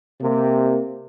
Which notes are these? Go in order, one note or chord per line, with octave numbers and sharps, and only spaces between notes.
C3 A#3